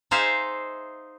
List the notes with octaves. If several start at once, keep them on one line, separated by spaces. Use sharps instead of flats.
D#4 G#4 C5 E5 F5